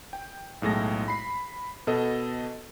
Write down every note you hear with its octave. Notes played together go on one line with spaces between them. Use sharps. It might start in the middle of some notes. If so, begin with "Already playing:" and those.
G5
B1 A2 G#3 A#6
B5 C7
B2 A4 D#5